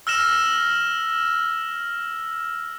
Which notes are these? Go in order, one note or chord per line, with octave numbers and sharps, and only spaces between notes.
E6 F6 A#6 E7